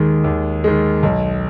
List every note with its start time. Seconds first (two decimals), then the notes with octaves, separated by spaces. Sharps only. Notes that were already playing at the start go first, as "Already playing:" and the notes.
Already playing: D#2 D#3 G#3
0.24 D#2
0.64 D#3 G#3
1.03 B1